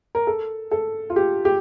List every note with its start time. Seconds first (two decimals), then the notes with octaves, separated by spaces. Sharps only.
0.15 A#4
0.27 A4
0.71 A4
1.10 F4
1.16 G4
1.45 G4